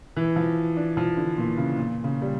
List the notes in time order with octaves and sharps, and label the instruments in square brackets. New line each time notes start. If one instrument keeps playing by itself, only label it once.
[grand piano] E3
F3
D4
F3
D3
A#2
C#3
A#2
C#3
G3